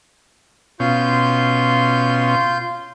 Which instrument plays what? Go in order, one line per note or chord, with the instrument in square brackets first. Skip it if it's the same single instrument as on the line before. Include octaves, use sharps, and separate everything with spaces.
[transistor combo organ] B2 C#4 [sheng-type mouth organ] F4 C6 G6